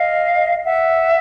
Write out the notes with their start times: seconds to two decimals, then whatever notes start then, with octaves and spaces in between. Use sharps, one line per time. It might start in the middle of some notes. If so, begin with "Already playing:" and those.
Already playing: D#5 F5
0.63 E5 F#5